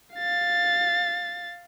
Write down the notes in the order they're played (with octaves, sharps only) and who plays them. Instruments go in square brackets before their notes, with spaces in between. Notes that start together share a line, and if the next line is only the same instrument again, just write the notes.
[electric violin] F5 A6